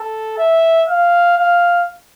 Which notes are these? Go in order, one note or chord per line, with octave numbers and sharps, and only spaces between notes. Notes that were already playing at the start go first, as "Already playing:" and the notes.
Already playing: A4
E5
F5
F5